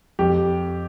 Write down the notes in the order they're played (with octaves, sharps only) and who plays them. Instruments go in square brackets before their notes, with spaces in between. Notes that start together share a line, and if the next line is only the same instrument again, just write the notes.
[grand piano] F2 G4